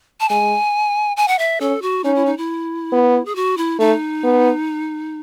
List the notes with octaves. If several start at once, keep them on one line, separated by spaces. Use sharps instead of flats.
A5
G#3 G#5
G#5
F#5
E5
C#4 A4
F#4
C#4 D#4
E4
D#4
E4
B3
G#4
F#4
E4
A3 D#4
B3